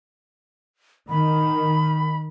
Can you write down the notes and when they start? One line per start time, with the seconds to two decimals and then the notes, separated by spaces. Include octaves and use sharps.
1.09 D#3 B5